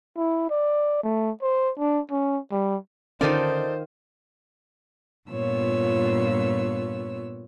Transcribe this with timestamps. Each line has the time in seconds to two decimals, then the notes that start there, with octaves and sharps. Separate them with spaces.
0.17 E4
0.50 D5
1.03 A3
1.42 C5
1.79 D4
2.11 C#4
2.51 G3
3.21 D3 D#3 C#4 D#4 F4 A4 C5 D5
5.29 G2 A#2 B3 F4 C#5 E6